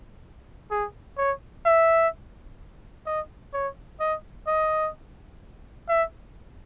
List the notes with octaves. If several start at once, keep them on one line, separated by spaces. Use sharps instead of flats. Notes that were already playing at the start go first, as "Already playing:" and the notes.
G#4
C#5
E5
D#5
C#5
D#5
D#5
E5